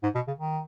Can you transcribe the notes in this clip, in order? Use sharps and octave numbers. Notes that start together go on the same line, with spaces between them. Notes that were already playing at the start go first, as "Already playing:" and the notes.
G#2
B2
C#3
D#3